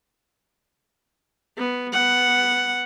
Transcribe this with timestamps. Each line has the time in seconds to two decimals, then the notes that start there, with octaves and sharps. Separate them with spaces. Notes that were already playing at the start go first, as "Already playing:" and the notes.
1.58 B3
1.93 B3 F#5